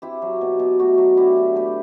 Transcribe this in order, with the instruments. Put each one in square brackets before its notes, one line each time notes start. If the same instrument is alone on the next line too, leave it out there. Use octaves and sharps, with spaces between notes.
[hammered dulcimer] C4 E4 G4
F#3
B2
B2
A3 F#4
F#3
D3 E4 G4
D4
A3 G4 B4